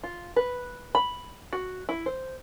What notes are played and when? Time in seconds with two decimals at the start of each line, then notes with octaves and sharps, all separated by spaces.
0.04 F4
0.36 B4
0.95 B5
1.53 F#4
1.89 E4
2.06 C5